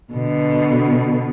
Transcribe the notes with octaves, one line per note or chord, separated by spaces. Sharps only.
B2 D3